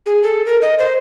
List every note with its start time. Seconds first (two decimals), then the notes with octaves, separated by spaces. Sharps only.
0.06 G#4
0.23 A4
0.46 A#4
0.62 D#5
0.79 C5